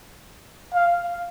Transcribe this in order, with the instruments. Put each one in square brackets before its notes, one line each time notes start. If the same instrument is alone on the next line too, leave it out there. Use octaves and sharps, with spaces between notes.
[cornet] F5